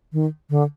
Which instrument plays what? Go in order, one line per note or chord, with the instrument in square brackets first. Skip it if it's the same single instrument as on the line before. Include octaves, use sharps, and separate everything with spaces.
[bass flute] D#3
D3